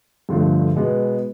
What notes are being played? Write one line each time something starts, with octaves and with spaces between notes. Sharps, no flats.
G2 D3 F3 A3
B2 G#3 B3